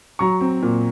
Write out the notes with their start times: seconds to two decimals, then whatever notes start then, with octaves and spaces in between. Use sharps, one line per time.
0.19 F#3 A#5 C#6
0.41 C4
0.62 A#2